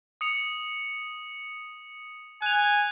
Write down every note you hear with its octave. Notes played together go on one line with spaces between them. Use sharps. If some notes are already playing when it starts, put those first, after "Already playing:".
D#6 C#7 F7
G#5 F#6 F7